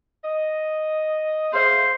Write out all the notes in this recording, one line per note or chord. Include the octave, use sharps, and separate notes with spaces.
D#5
G#4 C5 E5 F5